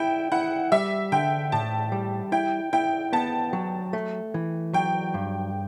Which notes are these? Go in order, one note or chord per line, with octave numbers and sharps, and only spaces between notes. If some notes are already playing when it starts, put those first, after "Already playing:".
Already playing: E4 G5
E4 F#5
G3 E5
D3 G5
A2 A5
G3
E4 G5
E4 G5
B3 A5
F#3
A3
E3
F#3 G5
G2